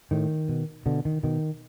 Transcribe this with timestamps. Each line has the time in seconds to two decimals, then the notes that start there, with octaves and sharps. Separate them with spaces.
0.11 A2 D#3
0.49 B2
0.86 B2 D3
1.05 D#3
1.23 B2 D#3